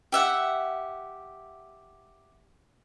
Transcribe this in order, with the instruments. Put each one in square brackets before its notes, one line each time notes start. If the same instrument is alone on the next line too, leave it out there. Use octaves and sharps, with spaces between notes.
[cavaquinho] G4 E5 F#5